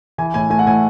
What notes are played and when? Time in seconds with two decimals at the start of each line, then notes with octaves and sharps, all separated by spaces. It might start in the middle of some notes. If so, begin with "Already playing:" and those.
0.18 E3 G#5
0.34 A2 G#5
0.50 A3 G#5
0.59 F#5
0.66 A2 G#5